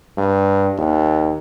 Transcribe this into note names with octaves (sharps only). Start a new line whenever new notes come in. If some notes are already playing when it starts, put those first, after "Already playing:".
G2
D#2